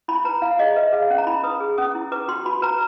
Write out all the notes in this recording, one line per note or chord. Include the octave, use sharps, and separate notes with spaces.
E4 B5
B4 A#5
E4 F5
G#4 D#5
B4 E5
G#4 F5
C#4
A#5
E4 B5
B4 D#6
G#4
C#4 D#6
E4
B4 D6
F#4 C6
F#4 B5
B4 A#5